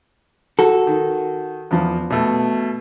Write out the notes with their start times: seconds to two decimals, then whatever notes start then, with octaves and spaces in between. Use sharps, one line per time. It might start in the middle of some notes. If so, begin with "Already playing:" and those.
0.59 F#4 A4
0.87 D#3
1.71 E2 F3
2.10 B2 A3